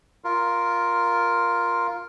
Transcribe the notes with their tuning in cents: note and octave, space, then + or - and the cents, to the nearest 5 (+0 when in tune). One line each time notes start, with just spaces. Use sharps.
F4 +0 A#4 +5